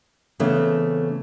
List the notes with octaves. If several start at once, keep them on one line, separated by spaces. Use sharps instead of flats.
C#3 E3 A3 B3 C4